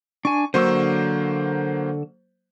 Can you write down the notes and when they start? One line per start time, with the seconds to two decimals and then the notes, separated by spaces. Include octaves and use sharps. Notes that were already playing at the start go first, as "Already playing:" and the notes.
0.25 D4 G#5 C#6
0.54 D3 F#3 A#3 C5 C#6 E6